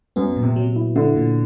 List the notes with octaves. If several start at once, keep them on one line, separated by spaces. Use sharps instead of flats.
F#2 B3
A#2
C3
F#3
E4
D3 E4
A#2